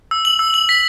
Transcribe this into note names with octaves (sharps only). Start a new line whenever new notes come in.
E6
F#7
E6
F#7
B6